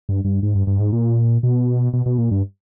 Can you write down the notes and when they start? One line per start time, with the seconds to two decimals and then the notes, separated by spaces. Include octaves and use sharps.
0.09 G2
0.25 G2
0.43 G#2
0.55 G2
0.67 G2
0.79 G#2
0.93 A#2
1.43 B2
1.93 B2
2.06 B2
2.18 A#2
2.31 G2